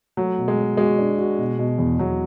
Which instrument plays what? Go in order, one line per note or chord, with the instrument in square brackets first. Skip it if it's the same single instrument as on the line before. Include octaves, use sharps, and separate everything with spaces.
[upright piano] F#3 [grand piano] A3
[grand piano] B2
[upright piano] G#3
[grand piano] B2
[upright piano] G#3 [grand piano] F#4
[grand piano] D4
F#4
B2
B2
E2
[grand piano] E2 [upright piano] F#3